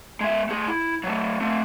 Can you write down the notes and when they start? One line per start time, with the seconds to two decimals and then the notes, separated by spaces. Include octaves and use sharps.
0.21 G#3 E5
0.49 A3 G#4
0.67 E4
1.04 F#3 A3
1.41 A3 C4